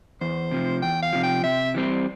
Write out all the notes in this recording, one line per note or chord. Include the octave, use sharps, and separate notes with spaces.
E2 C5
C3 F3
E2 G5
F5
C3 F3
G5
C3 E5
E3 G3 C4